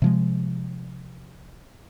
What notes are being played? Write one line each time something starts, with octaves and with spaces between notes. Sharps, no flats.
C3 F3 G#3